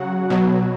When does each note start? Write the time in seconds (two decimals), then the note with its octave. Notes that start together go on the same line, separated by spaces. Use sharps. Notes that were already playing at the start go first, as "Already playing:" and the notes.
Already playing: C#3 F#3 F#4 F#5
0.30 B2 F#3